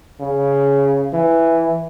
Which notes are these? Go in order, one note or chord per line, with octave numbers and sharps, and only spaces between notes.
C#3
E3